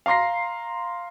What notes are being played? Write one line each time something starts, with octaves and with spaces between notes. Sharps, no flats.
F5 A#5 C6 A#6 C7